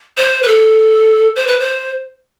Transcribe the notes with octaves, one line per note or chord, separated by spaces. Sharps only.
C5
B4
A4
C5
B4
C5